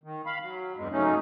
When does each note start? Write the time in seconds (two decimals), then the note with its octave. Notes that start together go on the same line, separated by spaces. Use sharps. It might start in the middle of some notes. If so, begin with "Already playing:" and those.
0.04 D#3
0.26 F5 B5
0.42 F#3
0.77 E2 G2 G#3
0.92 G#2 C#3 F#3 A3 C#4 D#4